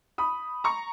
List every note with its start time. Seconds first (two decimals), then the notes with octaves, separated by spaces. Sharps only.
0.18 B5 D#6
0.64 A#5 C#6